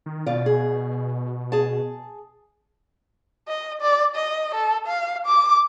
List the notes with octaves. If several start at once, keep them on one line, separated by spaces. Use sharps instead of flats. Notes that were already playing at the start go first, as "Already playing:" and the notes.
D#3
B2 F4 D5
G#4
G#4 A5
D#5
D5
D#5
A4
F5
D6